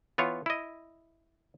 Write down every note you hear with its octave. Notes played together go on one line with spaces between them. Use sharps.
E3 B3 F4 C#5
E4 D#5